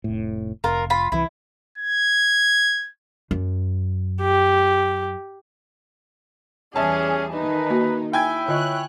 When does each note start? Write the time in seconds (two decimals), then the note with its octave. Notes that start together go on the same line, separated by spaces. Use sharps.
0.04 F1 A2
0.64 F1 F4 A#4
0.90 F4 B5
1.12 C2 E3 E4
1.78 G#6
3.31 F#2
4.21 G4
6.76 E2 G3 C#4 G#4 E5 G#5 A5
7.34 D#3 D#4 B4
7.70 A#3 F#4
8.13 E4 G5 G#5 G#6
8.48 D3 F4 C#5 D#5 F#6